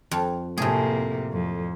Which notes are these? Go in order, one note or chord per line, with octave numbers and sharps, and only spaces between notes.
F2
A2 C3 A#3 G#4
F2